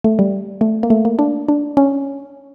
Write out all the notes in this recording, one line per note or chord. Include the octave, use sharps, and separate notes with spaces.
A3
G3
A3
A#3
A3
A#3
D4
D4
C#4